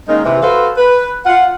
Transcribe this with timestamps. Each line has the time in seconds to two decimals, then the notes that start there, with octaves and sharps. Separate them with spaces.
0.09 D#3 G#3 A#3 C#4 D#4
0.25 C3 E3
0.43 F#4 A4 B4 C5 F5
0.77 B4
1.26 F4 F#5